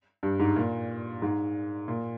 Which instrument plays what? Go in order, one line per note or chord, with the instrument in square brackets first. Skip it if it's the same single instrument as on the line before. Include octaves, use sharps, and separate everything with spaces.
[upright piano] G2
G#2
A#2
G#2
A#2